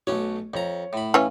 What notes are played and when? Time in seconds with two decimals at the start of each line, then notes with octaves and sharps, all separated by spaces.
0.07 B1 A3 C#4 F#4 C#5
0.54 F2 C#5 A#5
0.93 A2 B5
1.14 E3 C#4 F5